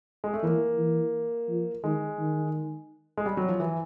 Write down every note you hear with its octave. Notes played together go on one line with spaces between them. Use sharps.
G#3
A3
E3 A#3
E3
F3
D#3 G#3
D#3
G#3
G3
F#3
F3
E3